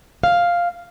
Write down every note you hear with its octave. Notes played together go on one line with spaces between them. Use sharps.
F5